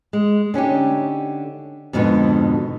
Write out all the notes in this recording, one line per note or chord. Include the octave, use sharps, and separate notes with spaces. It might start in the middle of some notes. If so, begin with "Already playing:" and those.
G#3
D3 C#4 D#4 G4
F2 G#2 B2 D3 D#3